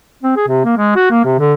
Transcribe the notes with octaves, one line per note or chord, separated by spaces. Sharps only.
C4
G#4
C3
A#3
G#3
F#4
A#3
C3
D3